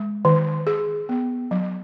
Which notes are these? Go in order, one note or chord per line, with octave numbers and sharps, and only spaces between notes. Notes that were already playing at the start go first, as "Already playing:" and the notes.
Already playing: G#3
D#3
G#4
B3
F#3